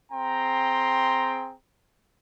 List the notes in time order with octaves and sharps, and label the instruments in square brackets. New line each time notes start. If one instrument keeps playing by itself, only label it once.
[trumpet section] C4 G#4 G5 A#5 C6